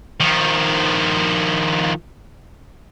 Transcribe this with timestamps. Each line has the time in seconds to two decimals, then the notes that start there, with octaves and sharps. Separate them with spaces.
0.20 D#3 F3